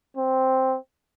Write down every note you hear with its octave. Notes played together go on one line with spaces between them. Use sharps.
C4